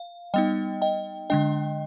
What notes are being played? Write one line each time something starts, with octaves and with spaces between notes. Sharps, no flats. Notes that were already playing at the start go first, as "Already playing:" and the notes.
Already playing: F5
G3 B3 D#4 D#5 G5
D#5 G5
D3 G#3 D4 D#5 G5